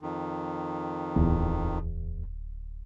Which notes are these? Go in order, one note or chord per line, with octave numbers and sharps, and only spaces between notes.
F2 D#3
D1 E2